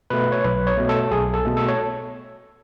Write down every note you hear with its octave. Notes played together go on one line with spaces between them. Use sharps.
B2 A3 B4
C#5
B1 B4
C#5
B2 A3
A4
B1 G#4
A4
B2 A3
A4
C#5